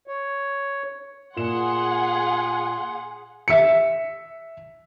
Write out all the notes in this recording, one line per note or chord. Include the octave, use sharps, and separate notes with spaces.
C#5
A#2 G#4 F#5 C6 E7
E5 C#7